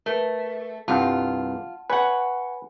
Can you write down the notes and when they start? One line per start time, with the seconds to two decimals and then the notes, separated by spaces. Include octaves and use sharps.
0.06 A3 A#4 B4
0.88 C2 G2 F4 F#5 G5 A5
1.90 B4 C#5 F#5 G#5